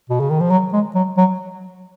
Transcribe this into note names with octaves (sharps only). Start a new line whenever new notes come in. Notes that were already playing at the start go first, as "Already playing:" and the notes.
B2
C#3
D#3
F3
F#3
G#3
F#3
F#3